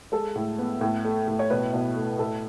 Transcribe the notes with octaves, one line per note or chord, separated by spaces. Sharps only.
G#3 A4
A2
B3
A2
A3
A2
C#5
B2 B4
B2
A3
A2 A4